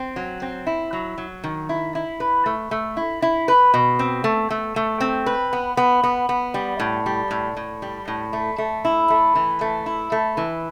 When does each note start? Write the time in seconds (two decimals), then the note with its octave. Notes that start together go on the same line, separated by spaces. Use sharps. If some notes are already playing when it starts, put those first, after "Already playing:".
Already playing: C4
0.16 F#3
0.42 C4
0.67 E4
0.93 F#3
1.18 F#3
1.44 D#3
1.69 E4
1.95 E4
2.20 B4
2.46 A3
2.71 A3
2.97 E4
3.22 E4
3.48 B4
3.74 B2
3.99 C4
4.24 A3
4.50 A3
4.76 A3
5.01 C4
5.26 B4
5.53 B3
5.77 B3
6.04 B3
6.29 B3
6.54 G3
6.80 A2
7.06 G3
7.31 A2
7.57 A2
7.82 G3
8.08 A2
8.33 A3
8.58 A3
8.85 E4
9.10 A3
9.35 E3
9.61 A3
9.86 E4
10.12 A3
10.37 E3